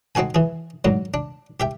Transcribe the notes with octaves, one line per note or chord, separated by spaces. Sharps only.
C4 D#4 F#4 A4 G#5
E3 G#4
G#2 D3 F#3
D4
G4 E5 G5